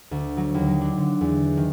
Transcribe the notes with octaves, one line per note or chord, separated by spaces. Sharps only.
D2
F#3
D#2
F#3
D4
D3
E2
D#3